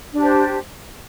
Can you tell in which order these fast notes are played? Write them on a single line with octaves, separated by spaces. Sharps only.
D4 G4 C5